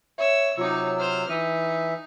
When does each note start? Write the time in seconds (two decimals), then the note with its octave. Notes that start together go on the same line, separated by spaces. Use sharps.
0.18 C#5 E5 E6
0.58 C3 F#3 D#4 F4 C#5 D6 E6
0.99 C5 F6
1.30 E3 D#4 E5 D#7